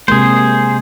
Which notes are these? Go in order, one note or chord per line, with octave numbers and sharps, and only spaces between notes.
C3 G#3 A#3 G#4 C5